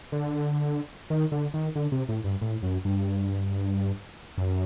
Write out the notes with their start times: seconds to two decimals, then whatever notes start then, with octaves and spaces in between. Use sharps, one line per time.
0.12 D3
1.10 D#3
1.32 D3
1.54 D#3
1.76 D3
1.92 C3
2.09 A2
2.24 G2
2.41 A2
2.63 F#2
2.85 G2
4.38 F#2